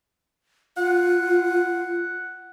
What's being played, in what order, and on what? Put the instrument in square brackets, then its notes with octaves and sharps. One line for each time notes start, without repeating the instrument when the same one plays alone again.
[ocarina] F4 [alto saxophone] F#5